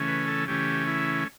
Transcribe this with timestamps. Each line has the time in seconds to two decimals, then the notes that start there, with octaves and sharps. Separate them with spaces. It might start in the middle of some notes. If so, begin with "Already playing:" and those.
Already playing: C#3 E3 A3 C#4
0.08 B4
0.28 A4
0.48 C#3 E3 A3 C#4 G4
0.87 E4